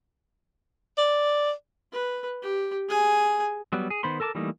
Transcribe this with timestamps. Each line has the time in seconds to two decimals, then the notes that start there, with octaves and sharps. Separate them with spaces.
0.98 D5
1.93 B4
2.42 G4
2.89 G#4 G#5
3.73 F#3 G3 B3
3.90 G#4
4.03 D#3 B3 C5 B5 C6
4.20 A4 A#4 A5 C#6 D6
4.35 E3 G3 A3 A#3 D#4